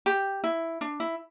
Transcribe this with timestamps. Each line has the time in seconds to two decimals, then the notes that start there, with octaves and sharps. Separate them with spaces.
0.06 G4
0.44 E4
0.81 D4
1.00 E4